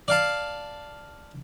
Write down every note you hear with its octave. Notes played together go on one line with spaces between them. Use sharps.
D5 F5 A5